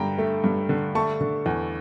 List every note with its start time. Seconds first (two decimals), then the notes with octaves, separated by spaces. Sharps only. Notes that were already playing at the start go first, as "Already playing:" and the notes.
Already playing: G2 D3 G5 A#5
0.18 A3
0.44 G2
0.69 D3
0.95 A3 A5 C#6
1.21 D3
1.46 E2